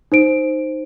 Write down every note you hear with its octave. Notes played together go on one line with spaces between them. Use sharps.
D#4 C5 D7